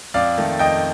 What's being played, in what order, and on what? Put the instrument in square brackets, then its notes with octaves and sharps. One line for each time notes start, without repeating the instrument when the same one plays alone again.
[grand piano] F2 D5 F5
D#3 A3
F2 D#5 G5